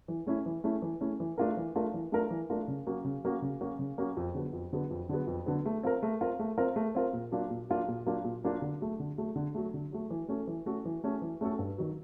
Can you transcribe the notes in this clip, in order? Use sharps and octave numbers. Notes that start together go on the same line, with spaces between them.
E3
A3 C#4 E4
E3
A3 C#4 E4
E3
A3 C#4 E4
E3
A3 D4 F4 A#4
E3
A3 D4 F4 A#4
E3
A3 D4 F4 A#4
E3
A3 D4 F4 A#4
C#3
F#3 A#3 C#4 F#4
C#3
F#3 A#3 C#4 F#4
C#3
F#3 A#3 C#4 F#4
C#3
F#3 A#3 C#4 F#4
F2
D3 F#3 B3
F2
D3 F#3 B3
F2
D3 F#3 B3
F2
D3 F#3 B3
A3
C4 F4 A#4
A3
C4 F4 A#4
A3
C4 F4 A#4
A3
C4 F4 A#4
A#2
F#3 A#3 D4 F4
A#2
F#3 A#3 D4 F4
A#2
F#3 A#3 D4 F4
A#2
F#3 A#3 D4 F4
D3
F#3 A3
D3
F#3 A3
D3
F#3 A3
D3
F#3 A3
E3
A3 C#4 F#4 A4
E3
A3 C#4 F#4 A4
E3
A3 C#4 F#4 A4
E3
A3 C#4 F#4 A4
G2
D#3 F#3